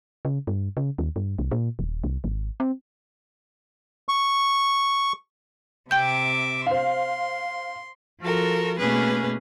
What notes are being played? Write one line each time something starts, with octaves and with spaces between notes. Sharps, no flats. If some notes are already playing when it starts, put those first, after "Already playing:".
C#3
G2
C#3
D#2
G2
C2
A#2
D#1
C2
G#1
C4
C#6
C3 E5 G5 D6 G6
C5 F5 C6
F3 F4 F#4 A4 A#4
B2 A3 A#3 C#4 G#4 B4